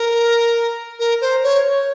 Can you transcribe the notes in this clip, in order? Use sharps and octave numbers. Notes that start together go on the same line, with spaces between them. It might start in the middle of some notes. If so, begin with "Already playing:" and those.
Already playing: A#4
A#4
C5
C#5